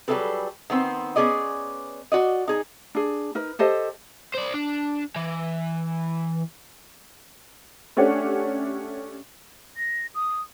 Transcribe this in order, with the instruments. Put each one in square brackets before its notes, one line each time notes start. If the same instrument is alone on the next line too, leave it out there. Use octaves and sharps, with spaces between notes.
[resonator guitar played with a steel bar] F#3 G3 D4 G#4 A4 B4
D#3 B3 C4 C5
B3 C#4 G#4 D5 D#5
F#4 D5 D#5
D#4 G#4
[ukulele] D4 G#4
D#4 A#4 B4
G4 A4 C5 D#5
[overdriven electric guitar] C5 D5
D4
E3
[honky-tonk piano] A3 C#4 D4 G4 C#5 F#5
[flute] A#6
D#6